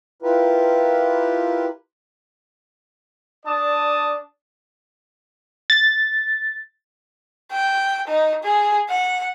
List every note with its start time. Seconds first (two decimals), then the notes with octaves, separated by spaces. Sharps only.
0.22 E4 F4 G4 A#4 B4
3.45 D4 D5 A5 D#6
5.70 A6
7.52 G5
8.08 D#4
8.43 G#4
8.89 F#5